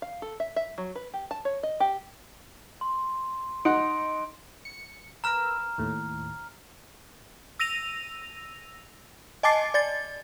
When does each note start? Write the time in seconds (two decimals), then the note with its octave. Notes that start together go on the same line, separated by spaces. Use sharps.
0.02 F5
0.22 A4
0.40 E5
0.56 E5
0.78 F#3
0.95 B4
1.13 G4
1.31 A5
1.45 C#5
1.63 D#5
1.80 G4
2.81 C6
3.65 D#4 F#5 C6 D7
4.65 C#7
5.24 A#4 B4 A#5 E6 F6
5.78 D#2 A2
7.59 E6 A#6 D#7 F7
9.43 D#5 G#5 A5 D6 A6 C7
9.74 D5 A6